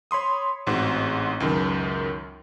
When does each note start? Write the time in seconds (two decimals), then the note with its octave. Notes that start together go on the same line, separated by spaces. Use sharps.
0.11 C#5 B5 C6 D#6
0.66 A1 G#2 C4 F#4
1.40 C#2 F#2 D#3